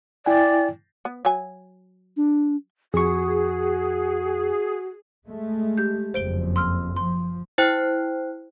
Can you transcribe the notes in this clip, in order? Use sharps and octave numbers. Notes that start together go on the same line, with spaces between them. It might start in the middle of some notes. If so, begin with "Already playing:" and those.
E4 D5 G5 G#5
B3
F#3 G#5
D4
F2 F#4 G#4 C#6
G#3 A3
G4 G6
F#1 F2 C5 D7 G7
C6 E6 F6
F3 C6
E4 C5 G5 F#6